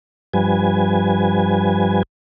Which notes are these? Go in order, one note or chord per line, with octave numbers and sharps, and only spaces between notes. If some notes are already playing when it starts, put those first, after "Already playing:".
G2 F3 G3 B4 G#5